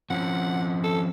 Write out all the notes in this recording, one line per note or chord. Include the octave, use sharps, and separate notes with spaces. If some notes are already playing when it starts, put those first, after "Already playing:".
F3 C4 C#4 F#5
A4